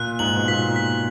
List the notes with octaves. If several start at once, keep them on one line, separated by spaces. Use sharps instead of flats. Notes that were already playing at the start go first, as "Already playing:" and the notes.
Already playing: A#2 F#6
G#2 F#7
B2
A#2 B6
B6